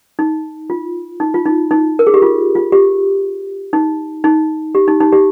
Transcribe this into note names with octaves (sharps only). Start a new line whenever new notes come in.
D#4
F4
D#4
F4
D#4
D#4
A#4
G#4
G4
F4
F4
G4
D#4
D#4
G4
D#4
D#4
G4